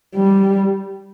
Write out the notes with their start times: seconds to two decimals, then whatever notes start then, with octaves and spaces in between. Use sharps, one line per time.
0.15 G3